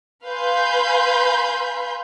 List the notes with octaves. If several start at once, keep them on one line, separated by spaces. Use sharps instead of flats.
B4 F5 G#5 B5 C6 G6